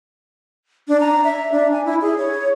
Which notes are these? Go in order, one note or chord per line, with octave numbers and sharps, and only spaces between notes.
D4
A#5
E5
D4
G#5
E4
G#4
C#5